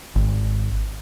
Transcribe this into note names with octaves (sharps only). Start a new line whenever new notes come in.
G#1